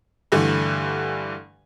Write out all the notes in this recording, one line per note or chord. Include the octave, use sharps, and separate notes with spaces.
G2 D3 E3 A3